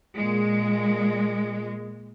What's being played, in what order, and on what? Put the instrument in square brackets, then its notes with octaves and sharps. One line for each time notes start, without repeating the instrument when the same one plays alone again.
[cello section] A#2 G#3